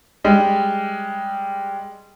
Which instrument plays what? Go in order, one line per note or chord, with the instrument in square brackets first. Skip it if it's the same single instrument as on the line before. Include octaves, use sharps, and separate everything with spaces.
[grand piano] G3 G#3